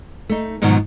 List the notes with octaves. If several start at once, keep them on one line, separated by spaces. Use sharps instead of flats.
A3 D#4
G#2 B2 D#3 F3 F#3